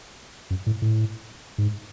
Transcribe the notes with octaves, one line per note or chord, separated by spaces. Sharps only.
F#2
A2
A2
G#2